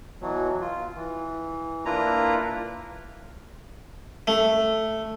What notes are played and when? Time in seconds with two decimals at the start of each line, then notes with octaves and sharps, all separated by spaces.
0.21 B2 E3 F#3
0.61 F4
0.95 E3
1.85 A#3 D4 E4 F4 B4 A#5
4.27 A3